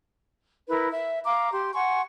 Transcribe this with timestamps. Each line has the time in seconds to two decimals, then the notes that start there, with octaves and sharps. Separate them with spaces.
0.68 E4 A#4 B4
0.91 E5
1.25 F5 A#5 D6
1.51 G4 C6
1.73 F#5 G#5 C6 C#6